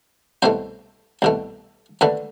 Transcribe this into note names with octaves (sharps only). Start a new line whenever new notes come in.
C2 B2 A3 C5
C2 B2 A3
D2 D3 A3 B4